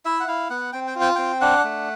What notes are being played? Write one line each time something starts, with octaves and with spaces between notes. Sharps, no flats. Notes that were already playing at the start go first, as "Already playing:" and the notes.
E4 E5
F#5
E4 F5
B3 F#5
C4 G5
G5
F4
G5
C4 G5
D4 F#5
A3